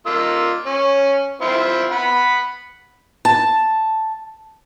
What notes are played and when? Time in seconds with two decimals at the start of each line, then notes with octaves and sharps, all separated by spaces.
0.06 A#3 F4 E6
0.66 C#4
1.42 C4 E4 F4
1.92 F#5 B5
3.25 A5